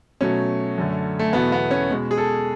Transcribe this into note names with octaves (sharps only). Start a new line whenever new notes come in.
B2 F#3 A3 C#4
F#2 D3 A3
A3
E2 B2 F#3 A3 B3
B3
C#4
B2 G#3
G#4
A4